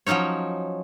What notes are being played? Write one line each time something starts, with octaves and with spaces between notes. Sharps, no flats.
F3 F#3 C#4 D#4 C#5